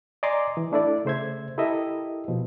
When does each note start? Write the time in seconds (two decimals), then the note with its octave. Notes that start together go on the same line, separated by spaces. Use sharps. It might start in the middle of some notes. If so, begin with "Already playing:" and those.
0.23 D5 D#5 G#5 A#5 C6 D6
0.57 E3
0.72 A3 D4 E4 A4 D5
1.05 C#3 A3 C5 E5 G#6
1.58 E4 G4 A4 A#4 D#5 E5
2.28 B2 F3